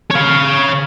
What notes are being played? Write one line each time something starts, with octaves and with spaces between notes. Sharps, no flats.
C#5 F5